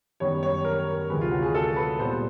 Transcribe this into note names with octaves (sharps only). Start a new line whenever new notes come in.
F#2 D#3 G3 B3 C#5
C#5
A#4
D2 C3 E3 G#3 B4
F4
F#4
G#4
A4
B4
A#2 G3 B3 C5